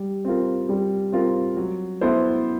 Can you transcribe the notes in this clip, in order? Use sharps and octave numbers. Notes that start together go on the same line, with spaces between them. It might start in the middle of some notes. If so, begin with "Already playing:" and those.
Already playing: G3
C4 F4 A#4
G3
C4 F4 A#4
F#3
B3 E4 A4 C5